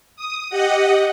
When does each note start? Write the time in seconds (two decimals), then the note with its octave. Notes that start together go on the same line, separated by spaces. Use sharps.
0.16 D#6
0.50 G4 D#5 F#5